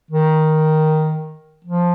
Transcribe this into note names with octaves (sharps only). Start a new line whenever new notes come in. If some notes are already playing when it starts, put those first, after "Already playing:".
D#3
F3